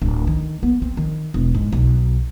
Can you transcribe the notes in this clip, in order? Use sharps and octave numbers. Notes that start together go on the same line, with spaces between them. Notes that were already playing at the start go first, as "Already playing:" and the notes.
D1
D#3
B3
C4
D#3
E1
G#2
B1